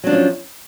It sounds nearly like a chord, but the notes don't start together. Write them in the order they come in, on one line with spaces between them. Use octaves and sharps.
F#3 D4 F3 C#4